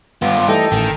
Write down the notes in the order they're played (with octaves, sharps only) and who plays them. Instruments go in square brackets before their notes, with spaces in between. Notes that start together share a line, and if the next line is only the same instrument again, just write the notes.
[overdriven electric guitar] G2 F4 [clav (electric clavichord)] B3
[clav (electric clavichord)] E3 G3 A3 [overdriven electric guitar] D#4 [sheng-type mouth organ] A4 G5
[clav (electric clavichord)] A1 [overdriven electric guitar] D#3